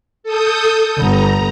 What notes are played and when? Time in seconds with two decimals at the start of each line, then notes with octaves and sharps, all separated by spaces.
0.23 A4 D#6 G6
0.98 G1 B3 A#5